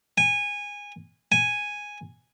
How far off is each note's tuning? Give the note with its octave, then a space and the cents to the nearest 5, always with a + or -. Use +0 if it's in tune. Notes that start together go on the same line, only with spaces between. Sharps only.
G#5 -20
G#5 -5